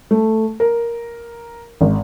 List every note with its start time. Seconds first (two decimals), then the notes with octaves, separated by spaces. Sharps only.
0.11 A3
0.60 A#4
1.81 G#1